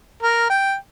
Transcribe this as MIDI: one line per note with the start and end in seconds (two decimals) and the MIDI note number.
0.23 0.48 70
0.50 0.75 79